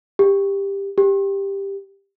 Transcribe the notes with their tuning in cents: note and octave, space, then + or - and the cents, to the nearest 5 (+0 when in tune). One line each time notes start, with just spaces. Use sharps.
G4 +15
G4 +10